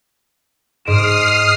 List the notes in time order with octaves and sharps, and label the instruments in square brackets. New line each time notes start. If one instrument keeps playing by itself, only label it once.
[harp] G#2 D7 E7 [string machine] D#6 F6 C7